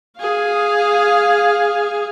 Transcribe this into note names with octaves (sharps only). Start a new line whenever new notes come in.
G#4 F5